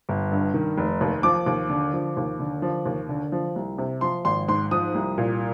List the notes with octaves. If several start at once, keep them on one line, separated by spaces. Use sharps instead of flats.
G1
G2
D#3
F1
D#2
F3 D6
D#2
D3
F3
D#2
D3
F3
D#2
D3
F3
C2
C3
F3 C6
G#1 C6
G#2 C6
F3 D#6
C2
A#2